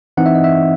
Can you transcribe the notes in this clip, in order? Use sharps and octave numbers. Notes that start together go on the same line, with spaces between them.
E3 C4 D#4 F#5
E5
D#5
E5